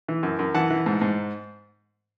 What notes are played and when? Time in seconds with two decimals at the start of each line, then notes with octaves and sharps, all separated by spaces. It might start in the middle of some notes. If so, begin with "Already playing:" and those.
0.08 E3
0.23 F#2
0.39 F#2
0.54 E3 F#5 A5
0.70 E3
0.86 G#2
1.02 G#2